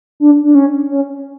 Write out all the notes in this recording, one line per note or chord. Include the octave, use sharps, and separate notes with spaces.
D4
D4
C#4
C#4